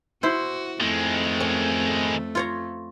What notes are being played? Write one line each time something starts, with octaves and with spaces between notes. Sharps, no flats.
E4 F#4 C5
F2 D#3 G#3 A3
C#4
F4 C#5 A#5